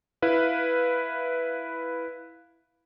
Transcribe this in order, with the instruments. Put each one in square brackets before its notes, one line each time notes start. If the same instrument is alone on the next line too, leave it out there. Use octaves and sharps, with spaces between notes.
[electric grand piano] E4 B4 F5